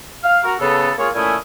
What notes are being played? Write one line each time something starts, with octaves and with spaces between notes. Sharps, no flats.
F5
F#4 A#4
C#3 B3 A4
A#3 F4 G#4 C#5
A#2 A3 C#4 E4 G#5 D#6